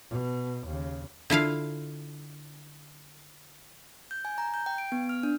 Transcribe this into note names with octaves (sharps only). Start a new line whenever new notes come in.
B2
D#2 C#3
D3 E4 F4 F5
G6
G#5
A#5
G6
G5
D7
B3
F6
D4